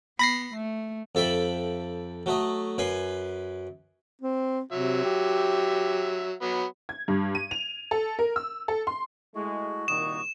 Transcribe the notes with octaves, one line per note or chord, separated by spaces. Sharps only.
B3 B5 A#6 C7
A3
F2 A4 E5 G5 B5
F#3 A3 D#5
F#2 B4 G#5 C6
C4
C3 F#3 E5
G4
F#3 B3
G#6
G2
D#7
F7
A4
A#4
E6
A4
C6
G#3 A3 E4 F#4
C2 A#2 D#3 C#6 D#6 E7